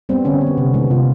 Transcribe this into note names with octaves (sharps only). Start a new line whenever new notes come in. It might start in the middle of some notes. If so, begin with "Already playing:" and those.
G3 B3 C4
D3 C#4
B3
G3
C3
D#3 G#3 B3
C3 F4